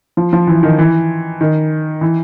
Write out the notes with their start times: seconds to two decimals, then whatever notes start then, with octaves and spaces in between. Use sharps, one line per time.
0.17 F3
0.33 F3
0.47 E3
0.63 D#3
0.79 E3
1.41 D#3
2.01 E3